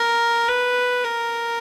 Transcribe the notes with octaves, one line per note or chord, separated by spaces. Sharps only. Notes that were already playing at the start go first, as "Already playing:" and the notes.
Already playing: A#4
B4
A#4